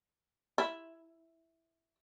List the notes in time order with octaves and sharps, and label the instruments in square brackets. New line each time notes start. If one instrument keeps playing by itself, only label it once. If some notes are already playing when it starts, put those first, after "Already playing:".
[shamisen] E4